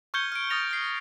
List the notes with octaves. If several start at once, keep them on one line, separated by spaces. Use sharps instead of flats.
C#6 F6 G6 G#6 C#7 G7
F6 D7
D#6 F6 A6 A#6 F7
F6 C7